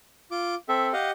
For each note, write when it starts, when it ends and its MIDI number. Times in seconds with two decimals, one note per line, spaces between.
0.31 0.55 65
0.31 0.55 86
0.69 0.93 60
0.69 0.93 69
0.69 0.87 76
0.93 1.11 67
0.93 1.11 75
0.93 1.09 77
0.93 1.11 78